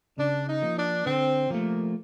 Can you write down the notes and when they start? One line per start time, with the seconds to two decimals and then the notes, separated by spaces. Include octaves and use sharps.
0.18 C#3 D4
0.46 D#4
0.62 F3 A#3
0.76 D4
1.05 D3 C4
1.50 F3 A3 A#3